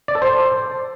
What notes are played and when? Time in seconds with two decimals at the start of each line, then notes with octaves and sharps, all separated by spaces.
0.08 D5
0.15 A4
0.22 C5